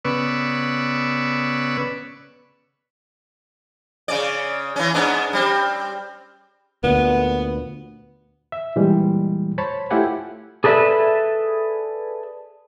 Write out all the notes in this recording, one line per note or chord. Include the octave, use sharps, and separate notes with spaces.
C#3 B3 B4 D5 C#6 E6
C#3 C#4 D5
E3 C#4
G#2 B3 D4
G3 C4
D2 A#2 D3 B3
E5
A#2 E3 G3 G#3
C5 C#5 A5 B5
A3 E4 F4 G4 F#5 G#5
G#4 A4 B4 D5 E5